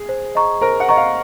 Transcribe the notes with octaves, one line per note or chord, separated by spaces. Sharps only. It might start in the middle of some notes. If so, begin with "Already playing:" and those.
Already playing: G#4
C5
D#5 A#5 C#6
A#4 C5
F#5
D#5 A#5 C#6
F5